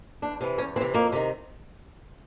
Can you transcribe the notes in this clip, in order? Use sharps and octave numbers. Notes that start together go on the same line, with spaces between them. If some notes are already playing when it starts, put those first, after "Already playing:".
E2 D4
C3 E3
E2 C#4
C3 E3 C4
F2 A#3
C3 D#3